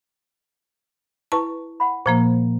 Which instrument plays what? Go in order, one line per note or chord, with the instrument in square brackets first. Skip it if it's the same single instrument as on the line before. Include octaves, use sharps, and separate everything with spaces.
[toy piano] E4 B4 [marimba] A5 C#6
[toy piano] F#5 B5
[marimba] A#2 F3 A#3 [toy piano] C5 A#5